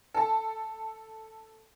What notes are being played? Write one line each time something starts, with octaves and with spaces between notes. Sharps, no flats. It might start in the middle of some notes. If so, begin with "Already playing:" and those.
A4 A5